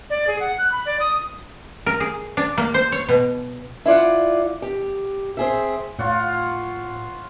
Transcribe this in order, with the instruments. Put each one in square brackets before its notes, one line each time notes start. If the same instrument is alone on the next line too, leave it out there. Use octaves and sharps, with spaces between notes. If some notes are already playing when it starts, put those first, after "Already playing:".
[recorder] D5
G#4
F#5
F#6
B5
D5
D#6
[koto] A#4
G#4
D4
A#3
C5
C#5
B2
[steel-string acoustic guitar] E4 F4 D5 F#5
G4
C4 G#4 E5
[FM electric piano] A2 [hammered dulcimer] F4 C#5 F#5